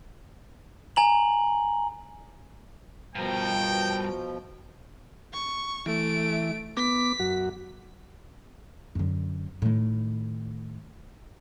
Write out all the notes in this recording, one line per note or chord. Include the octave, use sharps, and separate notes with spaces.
G#5 A#5 F#7
G2 B2 F3 A#4 G5
C#6
E3 A3 D7
B3 D6 B6
F#2 F#4
F#2 D3
A2 D#3